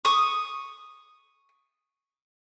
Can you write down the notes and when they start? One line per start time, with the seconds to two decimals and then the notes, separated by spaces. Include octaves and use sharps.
0.05 C#6 D#6